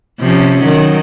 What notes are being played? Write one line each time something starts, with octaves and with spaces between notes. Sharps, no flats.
C3 F3 C#4
D#3 F#3